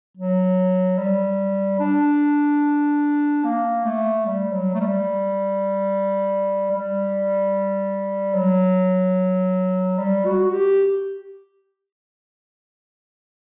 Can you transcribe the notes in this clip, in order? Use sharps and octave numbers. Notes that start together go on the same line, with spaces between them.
F#3
G3
D4
A#3
A3
G3
F#3
A3
G3
G3
F#3
G3
F#4
F#4
G4